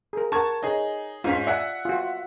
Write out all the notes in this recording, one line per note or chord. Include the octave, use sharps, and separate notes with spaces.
G#4 A#4
A#4 F#5 A5 C#6 G#6
D#4 G#4 C#5
G#2 C#4 F4 B6
D5 E5 F#5 G#5
F4 F#4